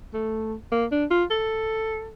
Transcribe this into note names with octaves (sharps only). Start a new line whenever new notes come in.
A3
A#3
D4
F4
A4